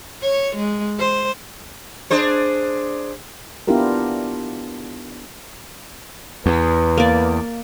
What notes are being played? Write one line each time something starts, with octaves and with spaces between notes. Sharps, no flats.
C#5
G#3
C5
D4 G#4 C5
B3 D4 E4 F4 G4 A#4
E2 B4
A#3 D5